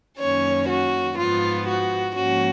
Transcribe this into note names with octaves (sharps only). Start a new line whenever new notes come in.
F#2 D#3 A#3 C#4 C#5
F#4
G#2 F3 B3 F4
F#4
G#2 F3 A#3 C#4 F#4